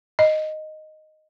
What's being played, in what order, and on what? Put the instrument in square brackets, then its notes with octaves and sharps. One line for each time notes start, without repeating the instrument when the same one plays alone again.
[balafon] D#5